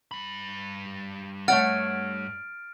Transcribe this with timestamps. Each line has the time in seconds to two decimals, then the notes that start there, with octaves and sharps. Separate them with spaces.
0.11 G2 B5
1.48 A3 C#5 F#5 F6 A6 D7